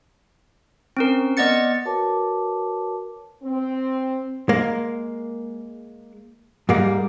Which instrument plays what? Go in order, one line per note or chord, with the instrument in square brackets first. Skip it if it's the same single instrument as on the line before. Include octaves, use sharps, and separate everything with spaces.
[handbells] C4 C#4 A#4
B3 D5 D#5 F#5 A6 C#7
[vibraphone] F#4 A#4 B4 C#5 A5 D6
[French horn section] C4
[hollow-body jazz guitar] G#3 A#3
G#2 G3 A#3